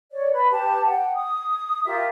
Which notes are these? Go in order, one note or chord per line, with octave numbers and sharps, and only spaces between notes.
C#5 D5
B4 B5
G4 B4 A5
F#5 G5
D#6
F4 G4 A#4 E5